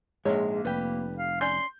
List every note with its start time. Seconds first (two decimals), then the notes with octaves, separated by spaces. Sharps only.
0.25 A#1 G#2 G#3 C#5
0.48 A#3
0.65 F1 G3 G4 B4
1.18 F5
1.41 C#4 D5 C6 G6